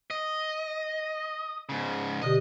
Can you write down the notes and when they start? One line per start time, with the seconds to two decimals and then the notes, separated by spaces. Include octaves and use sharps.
0.10 D#5
1.69 G#2 C#3
2.22 B2 D3 G4 D#5